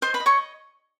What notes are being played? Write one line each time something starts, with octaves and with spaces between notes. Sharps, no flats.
C5 D#5 C6
B4 B5
D#5
C#5 C#6